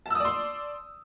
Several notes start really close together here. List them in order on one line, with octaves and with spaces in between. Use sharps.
A5 E6 D#6 D5 C6